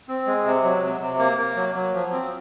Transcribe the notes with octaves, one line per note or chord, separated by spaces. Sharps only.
C4
G#3
C3
F#3
C3
C3
A#3
A#3
F#3
F#3
F3
C4